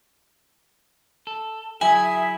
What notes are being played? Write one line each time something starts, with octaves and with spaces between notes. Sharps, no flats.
A4
F#3 E4 G#4 E5 G#5